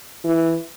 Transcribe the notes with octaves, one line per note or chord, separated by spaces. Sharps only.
E3